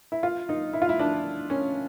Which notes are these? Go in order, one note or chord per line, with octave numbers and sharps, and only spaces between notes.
E4
F4
D#4
E4
F4
E4
D4
C#4